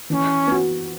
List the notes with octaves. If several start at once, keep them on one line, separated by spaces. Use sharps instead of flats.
E3 C#4 D4
B3 F#4